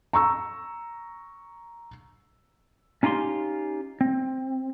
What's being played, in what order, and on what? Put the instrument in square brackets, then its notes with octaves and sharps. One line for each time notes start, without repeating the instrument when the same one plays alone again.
[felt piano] A#5 C#6 E6
[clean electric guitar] C#4 D#4 F4 G4 C6
C4